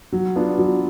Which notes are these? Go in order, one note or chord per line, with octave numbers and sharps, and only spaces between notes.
F#3
B3 D4 F4
F#3